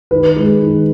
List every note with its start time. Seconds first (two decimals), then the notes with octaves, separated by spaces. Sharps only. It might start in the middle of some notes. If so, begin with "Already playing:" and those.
0.11 D#3 B4
0.36 G#3
0.62 D#3